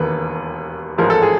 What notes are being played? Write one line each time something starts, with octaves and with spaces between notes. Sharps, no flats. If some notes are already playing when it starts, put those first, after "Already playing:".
Already playing: E1 D#2 D#3 B4
A1 G#2 F3 G#3 A#4
A4
G#4